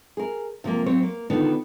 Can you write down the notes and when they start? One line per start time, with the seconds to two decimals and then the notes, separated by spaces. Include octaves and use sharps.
0.17 G#4 A#4
0.64 C3 F3 A3 A#3
0.86 F#3 C4 C#5
1.03 A#3
1.30 D3 D#3 B3 D4 D#4 F4